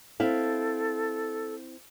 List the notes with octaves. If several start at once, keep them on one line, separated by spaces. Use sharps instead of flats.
C4 E4 A4 F5